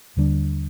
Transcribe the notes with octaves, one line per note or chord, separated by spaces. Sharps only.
D#2 D3 G3 D4